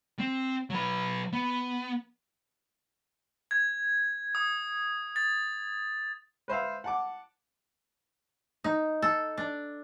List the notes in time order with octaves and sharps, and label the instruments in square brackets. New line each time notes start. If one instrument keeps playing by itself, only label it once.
[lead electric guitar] C4
F#3 B4
B3
[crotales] G#6
D#6
A6
[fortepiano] B4 C5 E5 F5
F#5 A5 D6
[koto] D#4
A4
D4